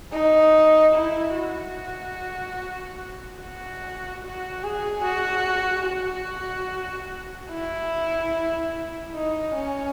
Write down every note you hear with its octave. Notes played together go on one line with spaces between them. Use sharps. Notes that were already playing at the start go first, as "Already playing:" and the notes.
D#4
E4
F#4
F#4
F#4
G#4
F#4
F#4
E4
D#4
C#4